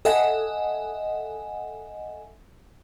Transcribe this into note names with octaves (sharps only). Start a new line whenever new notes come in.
A4 D#5 E5 F#5 G#5